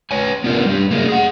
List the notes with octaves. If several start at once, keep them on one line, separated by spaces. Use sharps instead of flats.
B4 C#5 G#5
B3 D4 F4 A#4 B4
G3 D4
A3 A#3 F#4 G#4 A#4
G#4 F#5